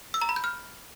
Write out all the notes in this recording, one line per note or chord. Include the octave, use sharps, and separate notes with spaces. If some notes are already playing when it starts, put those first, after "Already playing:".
E6
A#5
B5
G6
F6